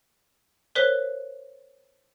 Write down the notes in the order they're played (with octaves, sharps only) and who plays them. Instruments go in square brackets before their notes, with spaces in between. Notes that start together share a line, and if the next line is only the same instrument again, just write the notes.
[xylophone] A#4 C5 C#5 F#6 B6 G7